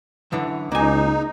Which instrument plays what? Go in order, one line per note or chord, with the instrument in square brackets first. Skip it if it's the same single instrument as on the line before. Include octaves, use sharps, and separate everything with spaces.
[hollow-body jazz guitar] F#2 D3 E3
[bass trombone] C#2 [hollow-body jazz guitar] A#3 G#5 [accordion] D#4